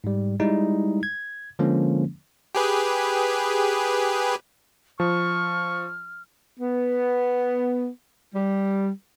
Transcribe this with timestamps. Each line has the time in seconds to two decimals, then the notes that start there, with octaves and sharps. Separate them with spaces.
0.04 G#2 G3
0.40 G3 G#3 D#4 E4
1.03 G#6
1.59 D3 F3 G#3 A#3 C#4
2.55 G4 G#4 B4
5.00 F3 C#6 F6
6.59 B3
8.35 G3